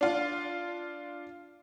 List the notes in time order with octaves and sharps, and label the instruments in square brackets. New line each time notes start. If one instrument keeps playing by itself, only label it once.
[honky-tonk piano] D4 F4